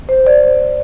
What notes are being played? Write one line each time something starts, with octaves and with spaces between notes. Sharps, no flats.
C5
D5